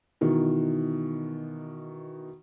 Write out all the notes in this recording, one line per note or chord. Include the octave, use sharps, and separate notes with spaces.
B2 D#3 E3